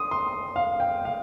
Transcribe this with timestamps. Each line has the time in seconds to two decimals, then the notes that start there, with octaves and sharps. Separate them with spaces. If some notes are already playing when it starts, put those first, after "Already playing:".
Already playing: C6 D#6
0.11 C6
0.56 F5
0.80 G5
1.05 F5